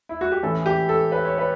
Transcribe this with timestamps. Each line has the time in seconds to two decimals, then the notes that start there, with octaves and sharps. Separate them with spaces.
0.09 E4
0.21 F#4
0.32 G4
0.43 A2 E3 A3 C#4 A4
0.66 G4
0.89 A4
1.12 B4
1.25 C#5
1.38 B4